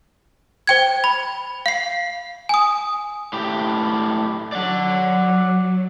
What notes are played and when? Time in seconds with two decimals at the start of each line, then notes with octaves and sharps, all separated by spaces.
0.67 C5 G5 G#6
1.04 B5
1.66 F5 C7
2.49 G#5 D#6
3.33 A2 G4
4.52 F#3 D5 F#5